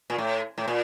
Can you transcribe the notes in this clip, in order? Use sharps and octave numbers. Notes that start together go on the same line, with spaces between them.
A#2
A2
A2
A#2